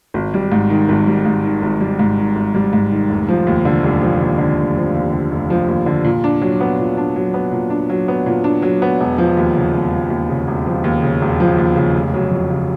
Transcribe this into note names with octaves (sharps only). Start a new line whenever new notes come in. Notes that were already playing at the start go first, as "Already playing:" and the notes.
G#1
G3
G#2
D#3
G#1
G3
G#2
D#3
G#1
G3
G#2
D#3
G#1
G3
G#2
D#3
F1
F3
D#2
D3
F1
F3
D#2
D3
F1
F3
D#2
D3
F1
F3
D#2
D3
A#2
D4
F#3
B3
A#2
D4
F#3
B3
A#2
D4
F#3
B3
A#2
D4
F#3
B3
E1
F3
D#2
C#3
E1
F3
D#2
C#3
E1
F3
D#2
C#3
E1
F3
D#2
C#3
F1
F#3
F2
C#3